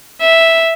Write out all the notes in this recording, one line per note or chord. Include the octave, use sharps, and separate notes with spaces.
E5